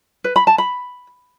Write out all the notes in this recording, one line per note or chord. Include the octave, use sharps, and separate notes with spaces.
B4
B5
A5
B5